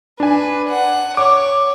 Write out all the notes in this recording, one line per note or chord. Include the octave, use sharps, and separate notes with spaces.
D4 B4 G#5
F#5
C#5 D6